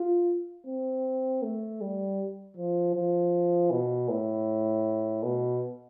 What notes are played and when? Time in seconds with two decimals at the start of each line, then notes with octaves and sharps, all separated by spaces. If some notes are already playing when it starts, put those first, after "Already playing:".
Already playing: F4
0.67 C4
1.43 A3
1.81 G3
2.57 F3
2.94 F3
3.71 B2
4.09 A2
5.23 B2